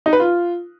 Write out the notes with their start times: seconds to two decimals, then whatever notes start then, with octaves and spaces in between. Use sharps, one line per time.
0.06 D#4
0.13 B4
0.20 F4